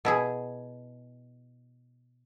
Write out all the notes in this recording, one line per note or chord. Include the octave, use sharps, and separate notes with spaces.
B2 E4 G#4